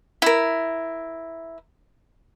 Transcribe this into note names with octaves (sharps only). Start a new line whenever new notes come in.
E4 A#4